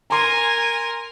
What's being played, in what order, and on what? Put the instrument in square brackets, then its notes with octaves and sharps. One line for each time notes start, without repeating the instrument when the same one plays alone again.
[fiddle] A#4 [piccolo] G#5 [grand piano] A#5 C6